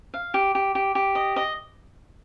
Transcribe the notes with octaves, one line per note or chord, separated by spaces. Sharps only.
F5
G4
G4
G4
G4
D#5
D#5